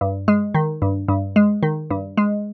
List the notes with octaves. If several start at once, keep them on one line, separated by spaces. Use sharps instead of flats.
G2
G#3
D#3
G2
G2
G#3
D#3
G2
G#3